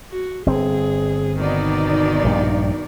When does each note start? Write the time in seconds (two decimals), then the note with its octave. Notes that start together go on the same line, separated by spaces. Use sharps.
0.12 F#4
0.46 G1 C4 G#4
1.40 B2 D#3 D#4 D5
2.24 A#1 G2